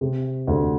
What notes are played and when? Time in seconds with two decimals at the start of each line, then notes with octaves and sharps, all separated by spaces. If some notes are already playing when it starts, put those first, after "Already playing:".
0.01 C3
0.47 D2